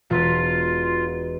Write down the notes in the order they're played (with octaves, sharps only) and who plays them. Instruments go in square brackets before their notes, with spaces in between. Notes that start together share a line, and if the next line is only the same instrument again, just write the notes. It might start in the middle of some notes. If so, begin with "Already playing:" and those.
[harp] E1 B6 [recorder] F4